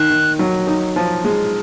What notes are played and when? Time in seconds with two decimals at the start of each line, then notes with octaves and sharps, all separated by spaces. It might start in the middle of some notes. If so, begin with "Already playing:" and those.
Already playing: D#3 F#6
0.10 D#3
0.39 F#3
0.67 D#4
0.96 F3
1.24 G#3